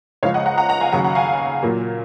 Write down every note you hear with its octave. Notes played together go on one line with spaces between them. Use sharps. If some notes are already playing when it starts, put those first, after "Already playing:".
C#2 C#3 F3 G#3 C#5 F5
D#5 F#5
F#5 A#5
F#5 A#5
F#5 A#5
F5 G#5
D#2 C#3 F#3 F#5 A#5
F#5 A#5
F5 G#5
A#2 F#3 A#3